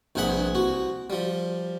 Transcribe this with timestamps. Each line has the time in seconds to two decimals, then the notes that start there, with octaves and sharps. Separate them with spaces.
0.15 A#1 G2 C3 G#4 F#5 B5
0.55 C2 F#4
1.10 F3 G3